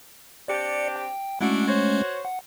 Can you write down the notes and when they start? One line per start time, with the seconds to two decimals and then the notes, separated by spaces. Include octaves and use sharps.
0.48 C4 D4 G4 D5 C#7
0.96 G5
1.41 G#3 A3 C#4 D4 E4 F#4
1.67 F#4 C5 C#5
2.25 F#5